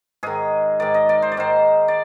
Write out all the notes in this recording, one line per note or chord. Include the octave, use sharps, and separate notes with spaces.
G#2 D#3 G#4
G#2 D#3 D5
D#5
D5
C5
D5
G#2 D#3 C5
D5